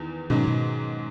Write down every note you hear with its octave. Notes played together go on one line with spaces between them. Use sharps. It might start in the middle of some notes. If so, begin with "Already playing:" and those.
Already playing: E2 D#3
G#2 B2 D#3 F#3 C#4
B2